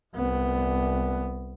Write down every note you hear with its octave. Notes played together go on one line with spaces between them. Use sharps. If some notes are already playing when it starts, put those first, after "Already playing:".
C2 B3